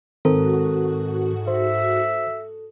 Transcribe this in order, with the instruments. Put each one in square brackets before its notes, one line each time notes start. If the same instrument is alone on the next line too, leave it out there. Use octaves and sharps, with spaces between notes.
[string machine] G#2 F#4 [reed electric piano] D#3 C4 A#4 [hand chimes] A4
[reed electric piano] C5 [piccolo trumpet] E5